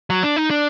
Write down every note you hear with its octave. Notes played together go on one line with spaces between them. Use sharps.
F#3
D4
D#4
D4